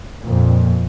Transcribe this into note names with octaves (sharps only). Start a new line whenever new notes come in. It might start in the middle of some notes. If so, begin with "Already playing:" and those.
F2 A#2